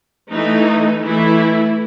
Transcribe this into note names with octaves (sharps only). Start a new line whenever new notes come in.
E3 A3 D#4
E3 A3 E4